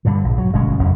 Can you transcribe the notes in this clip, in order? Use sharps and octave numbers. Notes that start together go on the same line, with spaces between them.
G2 A#2 D3
A#1
F#3
G1 B2 G#3 C#4
F#1 F2 F#3